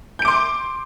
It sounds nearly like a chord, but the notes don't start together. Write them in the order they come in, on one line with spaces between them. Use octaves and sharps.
G6 D7 D6 C6